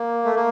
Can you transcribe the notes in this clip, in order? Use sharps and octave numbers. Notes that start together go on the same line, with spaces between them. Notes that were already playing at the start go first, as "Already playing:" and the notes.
Already playing: A#3
A3
A#3